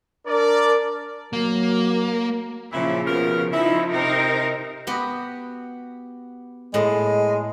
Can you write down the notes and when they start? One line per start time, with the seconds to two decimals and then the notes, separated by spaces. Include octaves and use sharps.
0.27 D4 A#4 D5
1.33 F#3 A#3
2.73 A#2 C#3 F3 C#4 E4
3.07 B2 B3 A#4
3.53 F3 D#4 E4
3.92 C3 D#4 A#4 C5
4.87 B3 F#4 G4
6.74 A2 G#3